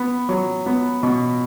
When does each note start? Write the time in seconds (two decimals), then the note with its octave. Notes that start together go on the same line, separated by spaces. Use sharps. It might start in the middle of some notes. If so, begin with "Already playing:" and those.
Already playing: B3
0.29 F#3
0.66 B3
1.03 B2